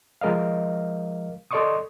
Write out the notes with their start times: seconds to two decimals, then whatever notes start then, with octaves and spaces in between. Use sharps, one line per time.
0.21 F3 G#3 A#4 D#5 F5
1.51 A4 D5 D#5 C6 C#6 D#6